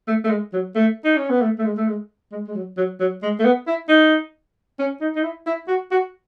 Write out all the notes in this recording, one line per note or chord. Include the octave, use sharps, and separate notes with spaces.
A3
A3
G#3
F#3
A3
D#4
C#4
B3
A3
A3
G#3
A3
G#3
G#3
G#3
F#3
F#3
F#3
G#3
A3
B3
E4
D#4
C#4
D#4
D#4
E4
E4
F#4
F#4